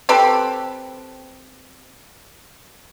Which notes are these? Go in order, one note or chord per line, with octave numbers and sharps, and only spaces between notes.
C4 G4 A4 B4